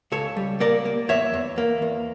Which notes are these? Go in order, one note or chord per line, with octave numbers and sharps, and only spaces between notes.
C#2 A4 C#5
G3
A#3 A#4 D5
A#3
E2 C#5 E5
E2
A#3
E2